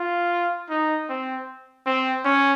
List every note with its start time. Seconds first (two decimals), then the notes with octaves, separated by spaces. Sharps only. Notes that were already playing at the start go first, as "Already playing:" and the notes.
Already playing: F4
0.70 D#4
1.09 C4
1.86 C4
2.25 C#4